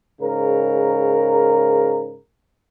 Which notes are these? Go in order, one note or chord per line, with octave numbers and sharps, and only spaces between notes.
G#2 C#3 A#4